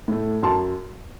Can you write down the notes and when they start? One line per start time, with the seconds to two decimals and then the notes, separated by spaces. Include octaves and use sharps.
0.08 A2 A3
0.43 F#2 A5 C6